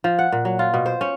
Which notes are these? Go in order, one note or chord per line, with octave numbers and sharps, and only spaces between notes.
F3
F#5
A#2
F#3
F4
B2
C5
C#4